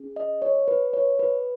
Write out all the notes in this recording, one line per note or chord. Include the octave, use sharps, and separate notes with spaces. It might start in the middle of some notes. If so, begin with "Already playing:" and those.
Already playing: C#4 G#4
D#5
C#5
B4
C#5
B4